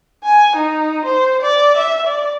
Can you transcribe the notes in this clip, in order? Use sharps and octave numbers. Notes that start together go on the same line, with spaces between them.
G#5
D#4
C5
D5
E5
D5